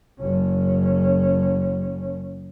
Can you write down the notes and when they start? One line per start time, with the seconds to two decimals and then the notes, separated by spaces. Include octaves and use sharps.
0.21 F#1 C#4